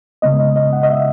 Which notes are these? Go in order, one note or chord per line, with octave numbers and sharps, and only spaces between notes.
C#3 G#3 B3 D#5
D#5
D#5
F#5
D#5
E5